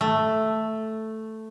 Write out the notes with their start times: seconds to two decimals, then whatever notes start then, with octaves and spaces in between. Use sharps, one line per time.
0.01 A3